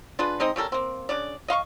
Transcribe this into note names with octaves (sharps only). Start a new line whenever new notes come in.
D4 F4 G#4 B4
G#3 C4 D#4 D#5
C#3 G3 A4 A#4
A#3 C4
C#3 D4 D5
D#5 F5 C6 C#6